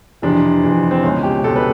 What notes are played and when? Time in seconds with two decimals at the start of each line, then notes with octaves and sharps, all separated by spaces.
0.22 F2 C3 E3 D4
0.64 F2 C3 E3
0.91 C4
1.03 C#2 B2 G#3 C#4
1.23 G4
1.44 C#2 B2 G#3 A4
1.56 B4